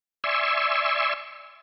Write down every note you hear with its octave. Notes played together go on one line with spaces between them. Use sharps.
D5 E5 G#5 C6 C#6 E6